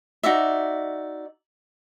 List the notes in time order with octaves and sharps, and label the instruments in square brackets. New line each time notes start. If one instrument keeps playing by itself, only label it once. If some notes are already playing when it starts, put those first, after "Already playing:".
[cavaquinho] D#4 F#4 D5 E5